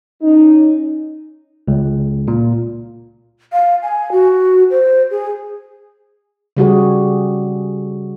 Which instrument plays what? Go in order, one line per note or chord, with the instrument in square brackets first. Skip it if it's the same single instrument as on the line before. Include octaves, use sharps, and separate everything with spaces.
[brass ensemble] C#4 D#4
[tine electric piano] C#2
A#2
[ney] F5
G#5
F#4
C5
G#4
[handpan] C#3 G3 F#4 G#4